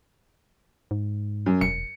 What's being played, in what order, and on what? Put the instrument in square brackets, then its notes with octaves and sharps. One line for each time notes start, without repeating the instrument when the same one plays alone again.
[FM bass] G#2
[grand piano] F#2
[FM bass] E1 [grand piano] C#7